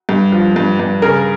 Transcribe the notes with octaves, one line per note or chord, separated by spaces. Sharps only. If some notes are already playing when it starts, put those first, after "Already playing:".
G2
F3
G2
G2
C#3 A#4